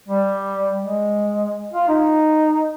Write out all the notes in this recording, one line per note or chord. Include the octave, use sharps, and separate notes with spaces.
G3
G#3
F4
D#4